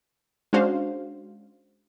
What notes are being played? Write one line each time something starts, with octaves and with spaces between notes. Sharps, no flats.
G#3 C#4 D4 F#4 C5 F5